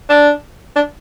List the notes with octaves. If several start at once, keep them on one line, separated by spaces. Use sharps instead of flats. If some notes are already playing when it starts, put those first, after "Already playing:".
D4
D4